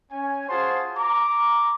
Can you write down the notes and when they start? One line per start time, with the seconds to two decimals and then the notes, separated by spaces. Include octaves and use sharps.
0.12 C#4 G#5
0.49 F4 F#4 G#4 C5 A5 C6
0.96 A#5 D6